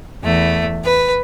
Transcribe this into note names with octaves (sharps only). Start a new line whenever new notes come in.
E2 A3
B4